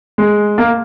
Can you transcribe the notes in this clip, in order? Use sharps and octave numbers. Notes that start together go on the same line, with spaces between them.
G#3
A#3